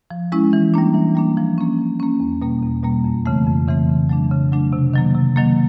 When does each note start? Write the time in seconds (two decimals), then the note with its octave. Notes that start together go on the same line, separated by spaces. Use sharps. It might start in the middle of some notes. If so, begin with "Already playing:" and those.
0.11 F3
0.32 G#3 C#4 E4
0.53 E3
0.74 G3 A#3 D4
0.94 E3
1.15 G3 A#3 D4
1.37 F3
1.58 A#3 C#4
1.78 F3
2.00 A#3 C#4
2.20 E2
2.42 B2 G3 A#3
2.63 E2
2.83 B2 G3 A#3
3.04 F2
3.26 C#3 E3 A3 C4
3.47 F2
3.68 C#3 E3 A3 C4
3.89 C#3
4.09 F#3 A3 D4
4.31 C#3
4.52 F#3 A3 D4
4.73 C3
4.94 D#3 F#3 A#3
5.14 C3
5.36 D#3 F#3 A#3